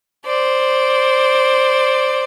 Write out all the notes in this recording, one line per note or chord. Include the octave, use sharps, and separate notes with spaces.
C5 D5